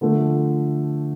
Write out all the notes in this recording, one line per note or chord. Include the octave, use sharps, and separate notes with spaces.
D3 F3 A3